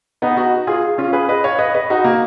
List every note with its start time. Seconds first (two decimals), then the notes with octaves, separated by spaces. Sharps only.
0.22 B3 D#4
0.37 D#4 F#4
0.67 F4 G#4
0.98 C#4 F4
1.13 G#4 B4
1.29 B4 D#5
1.44 C#5 F5
1.59 B4 D#5
1.75 B4 D#5
1.90 D#4 F#4
2.05 A#3